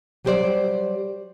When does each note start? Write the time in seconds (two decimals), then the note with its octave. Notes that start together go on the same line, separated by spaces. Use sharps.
0.25 F#3 G3 G4 A4 C5 D5